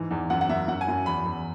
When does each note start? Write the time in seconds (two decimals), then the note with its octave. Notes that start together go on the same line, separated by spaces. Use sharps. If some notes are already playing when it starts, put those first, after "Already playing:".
Already playing: G#2 E3
0.11 E2
0.30 F#2 F#5
0.41 F#5
0.49 F#2 E5
0.68 F#2 F#5
0.81 G#5
0.88 F#2
1.06 E2 B5
1.25 E2